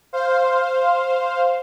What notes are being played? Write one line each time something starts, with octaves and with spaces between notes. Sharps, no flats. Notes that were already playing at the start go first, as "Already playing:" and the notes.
C5 F5